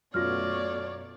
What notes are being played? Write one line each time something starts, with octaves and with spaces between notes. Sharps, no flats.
F#2 B2 A3 F4 C#5 D5 F6 A#6